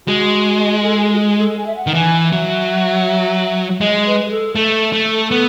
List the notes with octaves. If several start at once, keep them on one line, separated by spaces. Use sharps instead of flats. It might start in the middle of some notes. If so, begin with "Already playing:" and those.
G#3 F#4
A4
G#4
F#4
G#4
A4
G#5
E5
F#5
D#3
E3 G#5
F#3 E5
G#3 D#5
B4
G#4
A4
A3 A4
A3
B3